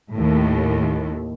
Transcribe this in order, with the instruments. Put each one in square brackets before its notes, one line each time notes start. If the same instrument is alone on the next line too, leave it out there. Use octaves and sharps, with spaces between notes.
[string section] D#2 A2